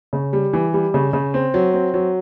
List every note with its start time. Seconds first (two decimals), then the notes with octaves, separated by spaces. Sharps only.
0.13 C#3
0.33 G3
0.53 E3
0.74 G3
0.94 C#3
1.13 C#3
1.34 C4
1.54 F#3
1.73 C4
1.94 F#3